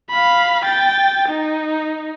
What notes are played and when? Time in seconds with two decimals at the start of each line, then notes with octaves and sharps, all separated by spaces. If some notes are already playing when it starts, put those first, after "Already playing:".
0.10 F5 B5
0.64 G5 A6
1.29 D#4